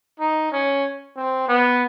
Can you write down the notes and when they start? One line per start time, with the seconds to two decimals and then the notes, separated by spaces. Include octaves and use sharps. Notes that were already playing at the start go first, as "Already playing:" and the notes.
0.20 D#4
0.52 C#4
1.17 C4
1.49 B3